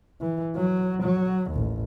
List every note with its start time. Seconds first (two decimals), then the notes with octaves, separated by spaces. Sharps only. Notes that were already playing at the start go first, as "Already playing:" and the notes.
0.21 E3
0.56 F#3
1.02 F#3
1.50 A1 D#2